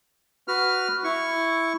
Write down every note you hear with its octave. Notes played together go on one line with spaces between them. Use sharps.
F#4 B4 F6
E4 C#6